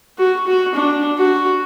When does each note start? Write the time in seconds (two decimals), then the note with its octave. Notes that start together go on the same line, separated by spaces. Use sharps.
0.18 F#4
0.47 F#4
0.75 D4
1.18 F#4